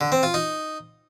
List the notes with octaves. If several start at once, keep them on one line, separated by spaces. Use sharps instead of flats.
D3
C4
F4
D#4